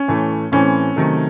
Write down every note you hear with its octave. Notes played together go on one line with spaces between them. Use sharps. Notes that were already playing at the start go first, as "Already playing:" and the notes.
Already playing: C#4
A2 E3 A3
A2 E3 A3 C4 C#4
C3 D#3 F#3 A3